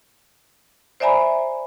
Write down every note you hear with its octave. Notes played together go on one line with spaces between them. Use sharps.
C5 D5 E5 G#5 A#5 B5